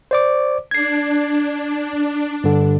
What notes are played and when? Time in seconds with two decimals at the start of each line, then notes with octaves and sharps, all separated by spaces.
0.11 C5 D5 D6
0.71 D4 G#6 C7
2.44 G2 D3